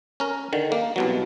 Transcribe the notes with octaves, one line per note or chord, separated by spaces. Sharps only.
C#4 A#4
D3 D#3
A#3
C2 B2 F#3